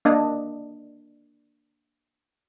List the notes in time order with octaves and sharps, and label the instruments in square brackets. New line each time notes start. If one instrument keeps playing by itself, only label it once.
[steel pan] A#3 D4 D#5